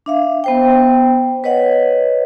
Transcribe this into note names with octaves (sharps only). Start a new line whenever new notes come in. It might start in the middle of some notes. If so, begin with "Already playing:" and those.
D4 E5 F5
B3 C5 G5
B4 C#5 D#5 F#5